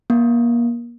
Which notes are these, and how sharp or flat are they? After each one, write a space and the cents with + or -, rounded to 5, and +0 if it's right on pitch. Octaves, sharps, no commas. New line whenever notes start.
A#3 +30